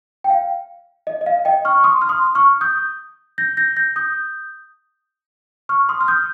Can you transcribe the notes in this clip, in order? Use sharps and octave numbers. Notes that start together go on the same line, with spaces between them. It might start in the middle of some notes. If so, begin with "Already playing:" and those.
G5
F5
D#5
D#5
F5
D#5 G5
C#6 F6
C#6
C6 D#6
F6
C6 D#6
C#6 F6
D#6 G6
G6 A#6
G6 A#6
G6 A#6
D#6 G6
C#6 F6
C6 D#6
F6
D#6 G6